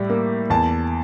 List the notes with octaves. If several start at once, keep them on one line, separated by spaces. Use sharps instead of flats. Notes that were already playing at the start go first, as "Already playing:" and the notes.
Already playing: A2 G3
A#3
E2 A5